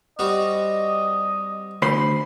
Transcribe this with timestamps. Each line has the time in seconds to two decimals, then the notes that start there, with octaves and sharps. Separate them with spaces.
0.19 G3 C4 F#4 D#5
1.82 D2 C5 B5 C6